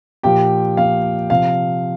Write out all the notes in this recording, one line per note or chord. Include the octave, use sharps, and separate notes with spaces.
A#2 F3 G4 G5
A#2 F3 F5
C3 F3 F5